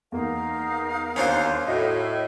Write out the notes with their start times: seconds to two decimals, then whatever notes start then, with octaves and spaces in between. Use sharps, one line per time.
0.12 E2 A#3 D#4 A#4 F5
1.16 D#2 C#4 D4 F4 C5
1.49 F5
1.67 A2 F#4 D#5 E5